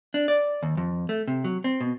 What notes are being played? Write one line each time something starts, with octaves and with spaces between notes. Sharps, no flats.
D4
D5
D#2
F2
A3
C3
F#3
C4
B2